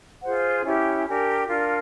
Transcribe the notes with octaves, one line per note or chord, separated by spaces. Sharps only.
F4 G#4 C5 F#5
C#4 E4 G4
D4 G4 A#4 G#5
D4 F4 A#4